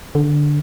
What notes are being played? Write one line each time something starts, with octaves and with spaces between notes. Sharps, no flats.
D3